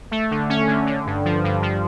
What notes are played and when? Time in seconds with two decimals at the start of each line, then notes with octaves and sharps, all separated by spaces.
0.11 A3
0.31 D3
0.49 C#4
0.68 D3
0.87 D3
1.06 G2
1.25 F3
1.44 G2
1.62 F3